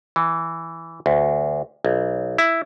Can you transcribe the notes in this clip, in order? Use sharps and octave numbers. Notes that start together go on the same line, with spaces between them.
E3
D2
B1
E4